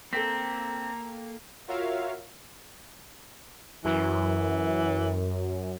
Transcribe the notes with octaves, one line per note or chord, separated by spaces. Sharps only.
A#3 C4 A4 G5 A#5 B6
F4 F#4 A#4 C#5 E5 F5
F#2 E3